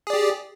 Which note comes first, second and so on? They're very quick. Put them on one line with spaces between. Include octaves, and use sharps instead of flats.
G#4 D5 G4